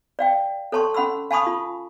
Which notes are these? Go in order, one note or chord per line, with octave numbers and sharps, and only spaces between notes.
D5 F5 G5
A4 C#5 A5 C6 C#6
C#4 F#5 B5 C6 E6
F5 G#5 A5 B5 C#6 D#6
F4